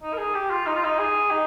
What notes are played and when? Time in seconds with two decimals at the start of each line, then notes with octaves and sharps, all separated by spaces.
0.03 D#4
0.13 A#4
0.18 G#4
0.34 G4
0.51 F4
0.66 D#4
0.76 F4
0.84 D#4
0.99 G#4
1.30 D#4